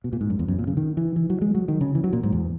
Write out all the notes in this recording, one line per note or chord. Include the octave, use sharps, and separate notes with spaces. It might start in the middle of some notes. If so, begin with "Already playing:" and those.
B2
A#2
G#2
F#2
E2
F#2
A#2
C#3
D#3
E3
E3
F#3
G#3
F#3
D#3
C#3
E3
F#3
A#2
G#2
E2